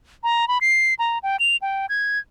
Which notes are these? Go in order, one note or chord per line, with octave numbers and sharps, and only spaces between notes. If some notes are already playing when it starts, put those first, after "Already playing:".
A#5
B5
C7
A#5
G5
F7
G5
G#6